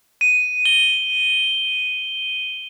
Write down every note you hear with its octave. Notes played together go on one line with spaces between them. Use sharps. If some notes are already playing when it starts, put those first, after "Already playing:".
D#7
G7